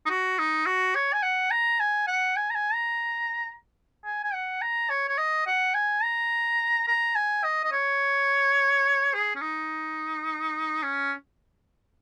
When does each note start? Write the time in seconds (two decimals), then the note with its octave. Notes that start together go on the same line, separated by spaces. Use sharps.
0.06 D#4
0.10 F#4
0.39 D#4
0.66 F#4
0.95 C#5
1.13 G#5
1.23 F#5
1.51 A#5
1.80 G#5
2.07 F#5
2.36 G#5
2.50 A#5
2.55 G#5
2.73 A#5
4.05 G#5
4.24 G#5
4.34 F#5
4.61 A#5
4.90 C#5
5.08 C#5
5.18 D#5
5.47 F#5
5.74 G#5
6.03 A#5
6.87 A#5
7.15 G#5
7.44 D#5
7.64 D#5
7.72 C#5
9.14 G#4
9.35 C#4
9.41 D#4
10.83 C#4